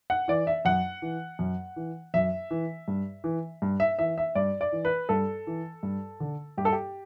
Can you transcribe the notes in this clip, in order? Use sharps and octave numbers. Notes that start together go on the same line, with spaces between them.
F#5
E3 D5
E5
F#2 F#5
E3
F#2
E3
F#2 E5
E3
G2
E3
G2
E5
E3 E5
E5
G2 D5
D5
E3
B4
G2 A4
E3
G2
D3
G2 G4
A4
G4